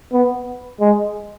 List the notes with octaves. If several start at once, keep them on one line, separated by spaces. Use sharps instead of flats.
B3
G#3